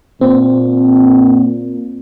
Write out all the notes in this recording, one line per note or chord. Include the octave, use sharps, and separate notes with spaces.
A#2 C4